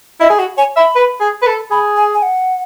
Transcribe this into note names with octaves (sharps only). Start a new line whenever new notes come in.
E4 D#5
G#4
F#4 F#5
C#5 G#5
E5 B5
B4
G#4
B4
A4
G#4 B5
G#5
G#5
F#5